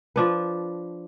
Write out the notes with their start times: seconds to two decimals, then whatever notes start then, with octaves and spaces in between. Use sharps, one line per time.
0.16 F3 D4 B4